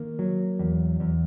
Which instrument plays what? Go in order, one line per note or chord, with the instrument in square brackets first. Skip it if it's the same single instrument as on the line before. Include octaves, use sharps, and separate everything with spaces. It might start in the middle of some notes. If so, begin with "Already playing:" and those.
Already playing: [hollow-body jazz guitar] D#3 A#3
F#3
E2
E2